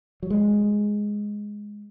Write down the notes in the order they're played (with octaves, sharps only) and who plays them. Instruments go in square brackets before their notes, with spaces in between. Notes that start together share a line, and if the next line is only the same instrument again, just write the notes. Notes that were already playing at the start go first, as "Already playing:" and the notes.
[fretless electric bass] F#3
G#3